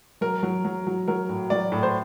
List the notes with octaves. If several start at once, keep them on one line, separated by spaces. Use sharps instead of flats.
F#3 A#4
F#3
F#3
F#3
F#3 A#4
A2
F#3 D5
A2
C5